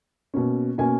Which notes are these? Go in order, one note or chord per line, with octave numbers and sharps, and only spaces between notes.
B2 A#3 C#4
B2 A#3 C#4 G#5